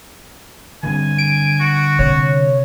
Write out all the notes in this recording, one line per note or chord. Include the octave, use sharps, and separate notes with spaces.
D3 G3 C4 G#5
D7
F#4
C3 C#5